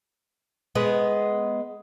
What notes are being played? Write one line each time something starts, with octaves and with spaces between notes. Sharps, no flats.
G#3 B3